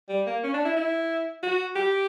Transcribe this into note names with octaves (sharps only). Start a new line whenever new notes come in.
G3
A#3
C#4
D4
E4
E4
F#4
G4